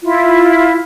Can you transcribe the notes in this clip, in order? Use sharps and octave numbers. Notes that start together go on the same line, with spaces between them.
E4 F4